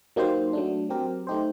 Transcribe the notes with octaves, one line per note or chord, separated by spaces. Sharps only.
F#3 A#3 D#4 G4 C5
F#3 A3 D4
F#3 C4 G4 A#4
A3 D#4 G4 C5